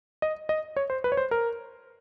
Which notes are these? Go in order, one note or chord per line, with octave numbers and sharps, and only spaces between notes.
D#5
D#5
C#5
C5
B4
C#5
C5
A#4